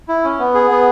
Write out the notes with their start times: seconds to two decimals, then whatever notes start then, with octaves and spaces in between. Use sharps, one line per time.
0.08 E4
0.24 C#4
0.39 B3
0.54 G#4
0.71 B3